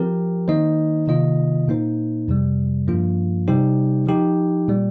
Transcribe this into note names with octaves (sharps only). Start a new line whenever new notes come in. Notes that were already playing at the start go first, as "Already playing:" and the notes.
Already playing: F3 C4 G4 A#4
D#3 A#3 D#4 C5 D#5
C3 D#3 A#3 F4 D#5
A#2 A#3 D#4 C5
F2 C3 G3
G2 F3 A#3 F4
C3 G3 D#4 G4 C5
F3 D#4 G4
A#2 G3